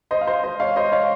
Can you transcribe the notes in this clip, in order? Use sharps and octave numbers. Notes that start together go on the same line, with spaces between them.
C5 D#5
F5
C5 D#5
C5 D#5
C#5 F5
C5 D#5
C#5 F5